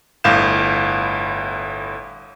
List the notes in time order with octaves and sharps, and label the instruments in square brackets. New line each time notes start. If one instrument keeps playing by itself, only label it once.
[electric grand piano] G1 A2 F5 G6 E7